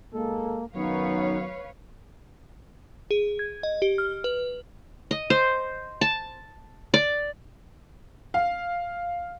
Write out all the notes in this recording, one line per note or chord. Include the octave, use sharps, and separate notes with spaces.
B1 G#3 A#3 A4
F#2 D#3 F#3 B3 D#4 B4 C#5 F5
G#4
G#6
D#5
G4
F6
B4
D#5
C5
A5
D5
F5